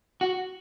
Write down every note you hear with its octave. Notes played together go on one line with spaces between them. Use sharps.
F#4